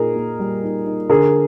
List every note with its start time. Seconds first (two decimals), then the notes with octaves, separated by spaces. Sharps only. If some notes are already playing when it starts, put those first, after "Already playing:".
Already playing: A#2 D#4 G#4 A#4
0.15 A#3
0.40 G3
0.63 D#4
0.86 D#4
1.09 D3 G#4 A#4